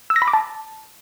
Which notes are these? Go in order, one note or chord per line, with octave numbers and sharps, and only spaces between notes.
E6
A#6
B5
D6
A5